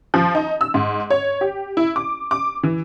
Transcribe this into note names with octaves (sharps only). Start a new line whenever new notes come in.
F3
D#4
E6
G#2
C#5
G4
E4
D6
D6
E3